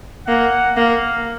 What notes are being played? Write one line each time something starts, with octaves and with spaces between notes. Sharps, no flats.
A#3 F#5
A#3 F5